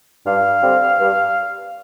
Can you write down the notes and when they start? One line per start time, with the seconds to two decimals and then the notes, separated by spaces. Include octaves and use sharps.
0.25 G2 F5
0.62 D3 G3 C4
0.99 G2